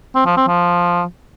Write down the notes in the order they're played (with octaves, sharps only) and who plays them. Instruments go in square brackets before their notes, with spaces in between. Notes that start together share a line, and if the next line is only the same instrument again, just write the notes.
[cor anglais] C4
F3
C4
F3